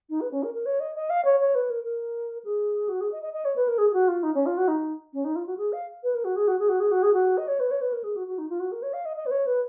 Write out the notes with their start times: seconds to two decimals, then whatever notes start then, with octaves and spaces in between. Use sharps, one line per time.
0.10 D#4
0.21 B4
0.31 C#4
0.43 A#4
0.54 A#4
0.66 C#5
0.80 D#5
0.95 D#5
1.10 F5
1.25 C#5
1.40 C#5
1.55 B4
1.70 A#4
1.84 A#4
2.45 G#4
2.89 F#4
3.01 G#4
3.12 D#5
3.22 D#5
3.34 D#5
3.45 C#5
3.56 B4
3.68 A#4
3.78 G#4
3.90 G#4
3.93 F#4
4.08 F4
4.23 D#4
4.35 C#4
4.46 F4
4.57 F#4
4.68 D#4
5.13 C#4
5.25 D#4
5.36 F4
5.47 F#4
5.58 G#4
5.73 F5
6.03 B4
6.15 A#4
6.25 F#4
6.36 G#4
6.48 F#4
6.59 G#4
6.69 F#4
6.80 G#4
6.91 F#4
7.03 G#4
7.14 F#4
7.38 D#5
7.48 C#5
7.60 B4
7.71 C#5
7.81 B4
7.93 A#4
8.04 G#4
8.16 F#4
8.27 F#4
8.38 D#4
8.50 F4
8.60 F#4
8.72 A#4
8.83 C#5
8.93 F5
9.05 D#5
9.17 D#5
9.26 B4
9.31 C#5
9.46 B4